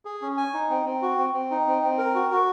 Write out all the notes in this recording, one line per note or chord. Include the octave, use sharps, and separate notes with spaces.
G#4
C#4
G#5
D#4
C4
C4
F#4
C4
C4
D#4
C4
C4
A#4
F#4
F#4